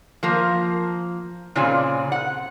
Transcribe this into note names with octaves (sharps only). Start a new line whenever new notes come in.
F3 A#3
A#2 C#3 C4 F4 D5 G#5
F#5